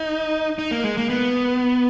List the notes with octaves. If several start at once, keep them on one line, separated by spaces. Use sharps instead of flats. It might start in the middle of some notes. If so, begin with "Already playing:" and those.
Already playing: D#4
D#4
A#3
G#3
A#3
B3